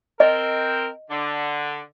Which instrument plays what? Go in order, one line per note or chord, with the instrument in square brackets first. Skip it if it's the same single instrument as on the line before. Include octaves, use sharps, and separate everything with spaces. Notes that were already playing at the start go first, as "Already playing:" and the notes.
[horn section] C4 A#4 G5 [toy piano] D#5
[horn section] D3